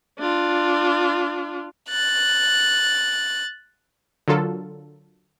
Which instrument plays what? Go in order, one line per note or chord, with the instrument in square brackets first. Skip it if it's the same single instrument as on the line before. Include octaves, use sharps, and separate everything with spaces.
[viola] D4 F4
[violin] F#6 A6
[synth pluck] D3 F#3 F4 A4 A#4